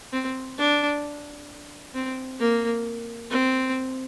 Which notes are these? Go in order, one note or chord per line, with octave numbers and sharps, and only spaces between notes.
C4
D4
C4
A#3
C4